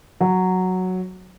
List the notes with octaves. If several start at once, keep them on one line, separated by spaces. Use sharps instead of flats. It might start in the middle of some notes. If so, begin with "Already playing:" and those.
F#3